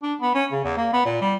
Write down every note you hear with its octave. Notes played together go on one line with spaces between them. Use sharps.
D4
B3
C#4
C#3
E2
A#3
B3
A#2
G3